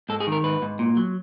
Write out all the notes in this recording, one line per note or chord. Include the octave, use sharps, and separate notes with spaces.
G#2 A4
G#4
D#3 A#4
G#2 B4
G#2
A#2
F#3